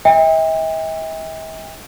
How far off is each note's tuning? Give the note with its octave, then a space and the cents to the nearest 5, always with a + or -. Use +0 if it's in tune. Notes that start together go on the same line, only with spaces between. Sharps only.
E5 -45 G5 +40